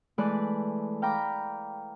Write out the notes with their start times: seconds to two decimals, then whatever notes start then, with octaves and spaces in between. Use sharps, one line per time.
0.18 E3 G#3 A3 B4 D5 F#6
1.02 F5 G5 A#5 B5 D6